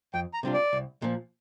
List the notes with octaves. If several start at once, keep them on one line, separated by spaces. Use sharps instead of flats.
F2 G5
A#5
C3 G3 D4 F4
D5
C2
A#2 F3